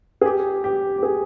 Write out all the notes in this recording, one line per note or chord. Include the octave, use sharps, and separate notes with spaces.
G#4
G4
G4
G4
G#4